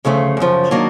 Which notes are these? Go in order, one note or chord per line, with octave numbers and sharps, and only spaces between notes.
D2 C#3 F3 A3
F#2 C#3 F3
D#3 F#3 A#3 D4